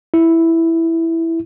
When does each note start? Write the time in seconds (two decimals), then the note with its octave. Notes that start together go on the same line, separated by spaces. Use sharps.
0.14 E4